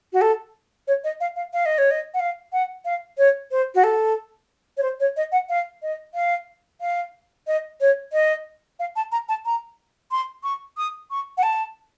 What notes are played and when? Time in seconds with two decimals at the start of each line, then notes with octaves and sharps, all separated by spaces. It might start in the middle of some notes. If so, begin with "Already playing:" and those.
0.13 F#4
0.21 A4
0.87 C#5
1.04 D#5
1.20 F5
1.36 F5
1.54 F5
1.66 D#5
1.78 C#5
1.91 D#5
2.14 F#5
2.20 F5
2.52 F#5
2.85 F5
3.18 C#5
3.51 C5
3.75 F#4
3.84 A4
4.77 C#5
4.82 C5
5.00 C#5
5.17 D#5
5.32 F#5
5.49 F5
5.82 D#5
6.14 F5
6.81 F5
7.47 D#5
7.81 C#5
8.13 D#5
8.79 F5
8.96 A5
9.12 A#5
9.29 A5
9.45 A#5
10.11 C6
10.43 C#6
10.77 D#6
11.10 C#6
11.37 F#5
11.43 A5